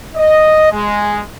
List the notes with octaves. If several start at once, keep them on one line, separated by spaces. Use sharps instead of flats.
D#5
G#3